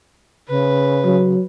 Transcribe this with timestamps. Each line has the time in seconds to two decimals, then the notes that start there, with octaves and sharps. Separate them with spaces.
0.49 C#3 B4
1.04 F#3